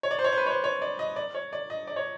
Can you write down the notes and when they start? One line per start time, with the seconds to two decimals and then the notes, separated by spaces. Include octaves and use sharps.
0.03 C#5
0.11 D5
0.19 C5
0.24 C#5
0.33 C5
0.37 B4
0.46 C#5
0.51 C5
0.64 C#5
0.82 D5
0.99 D#5
1.16 D5
1.35 C#5
1.53 D5
1.70 D#5
1.87 D5
1.96 C#5